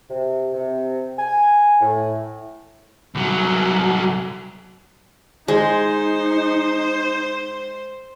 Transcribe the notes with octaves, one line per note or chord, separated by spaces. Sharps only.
C3
C3
G#5
A2
C2 F#3
G#3 D#4 C5